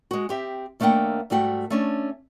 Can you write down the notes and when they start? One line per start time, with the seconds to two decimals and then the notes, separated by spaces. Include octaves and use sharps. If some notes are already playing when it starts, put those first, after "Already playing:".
0.11 G#3 F#4
0.29 C4 G4 E5
0.80 D#2 A3 A#3 D4 F#5 G5
1.30 G#2 G3 A3 F#4 G5
1.70 A3 C#4 D4